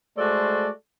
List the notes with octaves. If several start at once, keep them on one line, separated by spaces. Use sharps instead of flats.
G#3 A3 F#4 A4 C5 D5